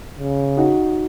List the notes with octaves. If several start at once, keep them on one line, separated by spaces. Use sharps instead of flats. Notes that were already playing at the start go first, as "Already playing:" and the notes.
C#3
D#4 F#4